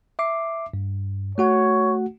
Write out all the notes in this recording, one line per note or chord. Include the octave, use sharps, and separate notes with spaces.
E5 D6 C7
G2
A3 F#4 C#5 F#5